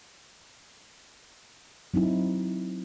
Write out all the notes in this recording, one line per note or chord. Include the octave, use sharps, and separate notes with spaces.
F#3 C4 D#4 E4